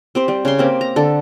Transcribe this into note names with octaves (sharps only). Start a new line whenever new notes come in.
C4 G4 C5
G3 C4
C#3 C6
A#3 C4 G4
A#5
D3 A4